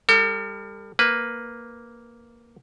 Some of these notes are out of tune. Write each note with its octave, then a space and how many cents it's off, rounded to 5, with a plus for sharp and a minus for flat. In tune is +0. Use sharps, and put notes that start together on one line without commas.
G3 +30 A4 +45
A#3 +0 B4 +0